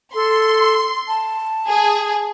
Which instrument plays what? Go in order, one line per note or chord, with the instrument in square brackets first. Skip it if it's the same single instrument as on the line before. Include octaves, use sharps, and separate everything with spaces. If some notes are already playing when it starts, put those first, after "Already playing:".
[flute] A4 [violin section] C6
[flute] A5
[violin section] G#4